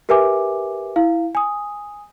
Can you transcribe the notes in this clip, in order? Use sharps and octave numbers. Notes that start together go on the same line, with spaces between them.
G4 A#4 B4 E5 G#5 D6
E4 F5
G#5 D#6